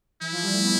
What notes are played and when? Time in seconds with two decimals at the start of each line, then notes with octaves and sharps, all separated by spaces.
0.21 E3 E4
0.32 F3
0.42 G3
0.53 A3
0.63 B3